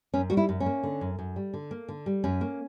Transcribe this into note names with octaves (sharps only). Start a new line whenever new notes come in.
F#2 C#4
G3 F#4
E4
F#2
C#4
A#3
D3
F#2
F#2
G3
D3
A#3
D3
G3
F#2 C#4
A#3